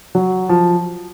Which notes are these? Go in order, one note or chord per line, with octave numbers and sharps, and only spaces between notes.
F#3
F3